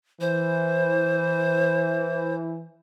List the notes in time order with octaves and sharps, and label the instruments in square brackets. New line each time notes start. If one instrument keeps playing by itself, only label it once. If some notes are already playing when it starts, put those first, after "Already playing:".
[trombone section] E3 [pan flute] C5